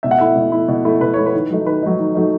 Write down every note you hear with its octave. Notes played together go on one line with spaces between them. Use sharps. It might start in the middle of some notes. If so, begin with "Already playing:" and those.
B2 E5
F#5
A3 E4 E5
B2
A3 E4
B2
A3 E4
B2 B4
A3 E4 C#5
B4
D#3
F#3 A3 D#4
D#3 B4
F#3 A3 D#4
D#3
F#3 A3 D#4